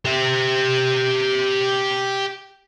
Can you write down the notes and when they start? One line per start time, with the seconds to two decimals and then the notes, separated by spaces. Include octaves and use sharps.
0.05 G4 E5